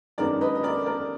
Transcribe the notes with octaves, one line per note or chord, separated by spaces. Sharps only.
F#2 D#3 G#3 B3 D4 A#4 D5
B4 D#5
D#5
A#4 D5
A#4 D5